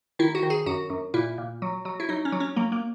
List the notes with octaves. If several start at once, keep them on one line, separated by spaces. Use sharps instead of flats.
D#3 E4
F#4
D#3
G#4
F#2 F#4
F#2
A#2 E4
A#2
F#3
F#3
E4
F#3 D#4
C#4
F#3
C#4
F#3 A#3
A#3